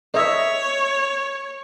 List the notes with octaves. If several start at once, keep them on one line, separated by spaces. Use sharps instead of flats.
C#5 D#5 E5